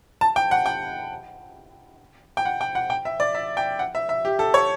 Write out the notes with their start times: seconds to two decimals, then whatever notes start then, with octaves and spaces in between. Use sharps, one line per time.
0.21 A5
0.36 G5
0.51 F#5
0.66 G5
2.37 G5
2.45 F#5
2.61 G5
2.75 F#5
2.90 G5
3.05 E5
3.20 D5
3.35 E5
3.57 G5
3.79 F#5
3.95 E5
4.09 E5
4.25 G4
4.39 A4
4.54 C#5